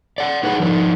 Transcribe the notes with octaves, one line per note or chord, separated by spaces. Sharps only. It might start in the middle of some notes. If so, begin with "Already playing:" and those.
D5 F#5
D#4 G#4 B4 C#5 F#5
F3 D4 D#4